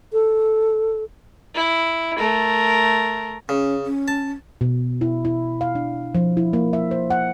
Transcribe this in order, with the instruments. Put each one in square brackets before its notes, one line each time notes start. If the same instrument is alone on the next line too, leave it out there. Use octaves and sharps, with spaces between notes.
[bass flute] A4
[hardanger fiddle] E4
A3 A#4
[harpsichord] C#3 [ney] C#4
[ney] C#4
[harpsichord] A5
[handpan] B2
E4
E4
F5
D4
F3
E4
A#3
E5
C5
F#5